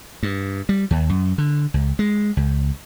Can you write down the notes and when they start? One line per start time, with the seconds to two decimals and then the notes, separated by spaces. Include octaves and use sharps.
0.23 G2
0.69 G3
0.91 D#2
1.09 F#2
1.38 D3
1.74 C#2
1.99 G#3
2.37 C#2